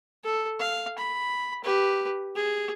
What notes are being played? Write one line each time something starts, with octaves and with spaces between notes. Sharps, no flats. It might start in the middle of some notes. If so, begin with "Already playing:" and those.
A4
F5
B5
G4 B4
G#4